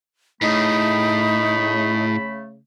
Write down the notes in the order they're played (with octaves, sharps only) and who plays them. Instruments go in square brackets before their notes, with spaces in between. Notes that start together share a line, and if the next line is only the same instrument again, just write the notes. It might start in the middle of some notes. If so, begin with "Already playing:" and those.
[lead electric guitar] A2 [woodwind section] C#3 A3 [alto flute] D#4 [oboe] B5